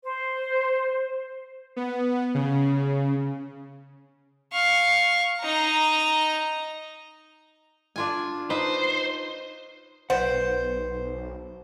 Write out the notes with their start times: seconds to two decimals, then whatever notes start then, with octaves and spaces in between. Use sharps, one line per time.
0.03 C5
1.76 B3
2.34 C#3
4.53 F5 C#6
5.40 D#4 A#5
7.96 D4 F4 G#5
8.50 D#4 B4 C5
10.10 B1 B4 C5 D5 F#5